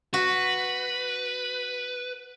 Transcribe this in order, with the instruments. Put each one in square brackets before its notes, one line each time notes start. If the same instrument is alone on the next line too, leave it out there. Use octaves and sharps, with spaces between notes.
[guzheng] F#4 [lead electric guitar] B4